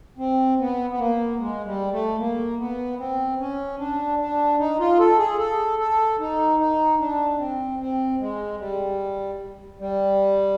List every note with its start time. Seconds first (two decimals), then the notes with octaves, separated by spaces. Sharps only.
0.18 C4
0.60 B3
0.90 B3
0.99 A#3
1.38 G#3
1.66 G3
1.92 A3
2.19 A#3
2.59 B3
2.99 C4
3.40 C#4
3.79 D4
4.20 D4
4.59 D#4
4.80 F4
4.99 A4
5.19 G#4
5.39 A4
5.80 A4
6.19 D#4
6.59 D#4
7.00 D4
7.39 C4
7.79 C4
8.20 G#3
8.59 G3
9.80 G3